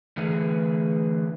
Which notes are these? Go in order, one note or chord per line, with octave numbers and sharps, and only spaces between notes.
D3 E3 A3 G#4 B4